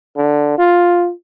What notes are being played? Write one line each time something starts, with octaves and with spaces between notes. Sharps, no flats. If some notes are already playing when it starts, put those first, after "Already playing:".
D3
F4